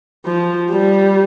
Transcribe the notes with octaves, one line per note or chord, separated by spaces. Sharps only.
F3
G3